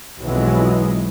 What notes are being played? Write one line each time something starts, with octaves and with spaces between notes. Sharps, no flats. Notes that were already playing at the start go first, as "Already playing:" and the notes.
B1 F2 B2 E3 F#3 G#3